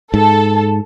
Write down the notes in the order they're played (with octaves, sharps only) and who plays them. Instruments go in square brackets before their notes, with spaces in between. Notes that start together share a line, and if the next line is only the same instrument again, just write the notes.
[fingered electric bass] G#2 [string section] A4